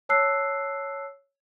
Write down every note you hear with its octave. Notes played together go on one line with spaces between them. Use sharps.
C#5 A5 E6 F#6 C7